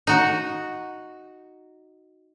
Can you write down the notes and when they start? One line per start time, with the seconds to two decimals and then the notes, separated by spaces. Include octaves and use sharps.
0.07 D#4 F#4